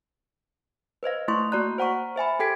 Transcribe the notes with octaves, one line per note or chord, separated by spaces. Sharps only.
B4 C5 D#5 F5
A3 E4 C6 C#6
A#3 F#4 D5 A#5 F#6
C5 F#5 A#5 C#6
C5 E5 G#5 B5
G4 A4 G5 G#6 B6 D7